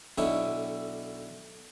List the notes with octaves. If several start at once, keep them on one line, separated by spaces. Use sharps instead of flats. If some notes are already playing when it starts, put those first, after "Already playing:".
B1 D3 D#4 E4 C#5